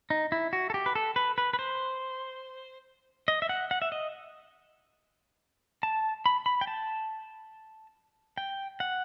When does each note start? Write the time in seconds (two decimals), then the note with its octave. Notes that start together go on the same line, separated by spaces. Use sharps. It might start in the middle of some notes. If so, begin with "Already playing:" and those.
0.10 D#4
0.32 E4
0.53 F#4
0.70 A4
0.74 G4
0.86 B4
0.95 A4
1.16 B4
1.38 B4
1.53 B4
1.59 C5
3.28 D#5
3.42 E5
3.49 F#5
3.71 F#5
3.82 E5
3.92 D#5
5.83 A5
6.26 B5
6.46 B5
6.61 G5
6.67 A5
8.38 G5
8.80 F#5